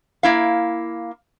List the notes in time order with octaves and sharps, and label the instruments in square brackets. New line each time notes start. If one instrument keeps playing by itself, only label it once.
[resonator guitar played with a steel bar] A#3 E4 F5